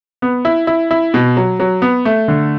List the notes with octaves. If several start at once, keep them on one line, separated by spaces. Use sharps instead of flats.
B3
E4
E4
E4
B2
F#3
F#3
B3
A3
D3